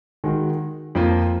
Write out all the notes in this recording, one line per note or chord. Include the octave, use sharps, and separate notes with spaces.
D#3 G#3 D#4 F#4
F2 F3 A#3 F4